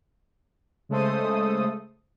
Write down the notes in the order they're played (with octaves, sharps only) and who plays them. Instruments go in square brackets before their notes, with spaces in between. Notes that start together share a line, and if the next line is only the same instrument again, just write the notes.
[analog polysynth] C#3 G#3 A3 A4 C5 D#6